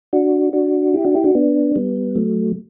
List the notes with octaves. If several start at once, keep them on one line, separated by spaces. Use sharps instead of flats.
D4 F#4
D4 F#4
E4 G4
D4 F#4
E4 G4
D4 F#4
B3 D4
G3 B3
F#3 A3